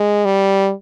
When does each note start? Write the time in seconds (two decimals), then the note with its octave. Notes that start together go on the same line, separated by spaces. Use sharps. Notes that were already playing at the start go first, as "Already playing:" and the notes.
Already playing: G#3
0.25 G3